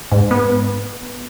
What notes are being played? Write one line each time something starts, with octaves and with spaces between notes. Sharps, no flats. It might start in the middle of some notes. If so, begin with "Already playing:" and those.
G#2
B3